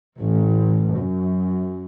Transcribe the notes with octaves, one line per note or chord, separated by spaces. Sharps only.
A1
F#2